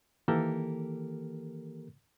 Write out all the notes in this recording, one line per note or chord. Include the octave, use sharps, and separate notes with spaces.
D#3 E3 A#3 G4 A4 A#4